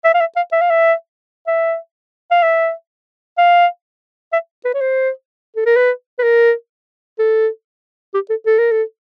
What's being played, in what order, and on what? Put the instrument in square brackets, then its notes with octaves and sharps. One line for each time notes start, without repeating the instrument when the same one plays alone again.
[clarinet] E5
F5
E5
F5
E5
F5
E5
E5
F5
E5
F5
E5
B4
C#5
C5
A4
A#4
B4
B4
A#4
A4
G4
A4
A4
A#4
A4